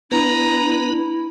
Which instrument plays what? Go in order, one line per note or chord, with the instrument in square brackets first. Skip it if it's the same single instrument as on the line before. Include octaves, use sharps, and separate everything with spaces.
[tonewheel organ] B3 B4 [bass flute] D4 [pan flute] E4 [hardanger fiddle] A#5